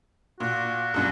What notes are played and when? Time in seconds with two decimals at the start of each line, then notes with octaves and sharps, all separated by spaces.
0.40 A#2 F#4
0.94 C2 F#2 A#2